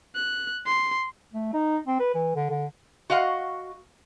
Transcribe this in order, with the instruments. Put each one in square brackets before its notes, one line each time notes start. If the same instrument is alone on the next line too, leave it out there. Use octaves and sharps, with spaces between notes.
[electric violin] F#6
C6
[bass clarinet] A3
D#4
C4
B4
E3
D3
D3
[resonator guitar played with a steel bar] F#4 D#5 F5 F#5